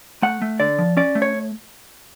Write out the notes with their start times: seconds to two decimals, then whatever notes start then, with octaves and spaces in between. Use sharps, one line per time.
0.22 A3 F#5
0.42 A3
0.60 D3 D5
0.79 F3
0.97 C#4 D5
1.15 A3
1.22 C#5